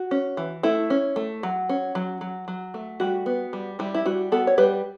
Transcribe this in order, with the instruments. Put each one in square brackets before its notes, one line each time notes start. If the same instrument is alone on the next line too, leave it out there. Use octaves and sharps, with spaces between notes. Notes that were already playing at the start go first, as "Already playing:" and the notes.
Already playing: [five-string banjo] F#4
C#4
E3
A3 E4
C#4
A3
F#3
C#4
F#3
F#3
F#3
A3
G3 F#4
B3
G3
G3 E4
E4
G3 F#4
B3 F#4 A4
C#5
G3 G4 B4